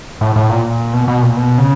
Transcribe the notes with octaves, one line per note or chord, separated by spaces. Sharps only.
A2
A2
A#2
B2
B2
A#2
B2
C#3